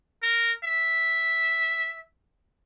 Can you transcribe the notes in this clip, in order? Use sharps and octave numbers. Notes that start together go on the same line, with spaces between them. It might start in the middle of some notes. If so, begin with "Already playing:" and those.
A#4
E5